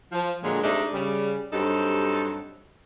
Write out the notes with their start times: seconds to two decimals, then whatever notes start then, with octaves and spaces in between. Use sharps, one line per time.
0.12 F3
0.42 A#2 D3 F#3 G#3
0.62 G#2 C3 A3 D4 D#4 D#5
0.93 C#3 G3
1.53 G2 F#3 C4 D#4 G4 A4